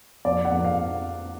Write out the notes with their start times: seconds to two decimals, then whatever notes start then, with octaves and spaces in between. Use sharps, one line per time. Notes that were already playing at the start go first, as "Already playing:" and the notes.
0.25 F2 D5
0.45 F#5
0.52 F2
0.65 F5